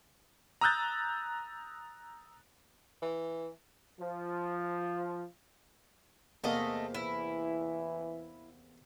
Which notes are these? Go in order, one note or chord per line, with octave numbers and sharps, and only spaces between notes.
A#5 D#6 E6 F#6 G6 A6
E3
F3
E2 C3 A3 A#3 D#5
E3 E4